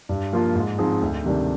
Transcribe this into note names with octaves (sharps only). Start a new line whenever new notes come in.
G2
F3 A#3 F4
G#2
F3 C4 D#4 G#4
D2
C3 D#3 G3 D4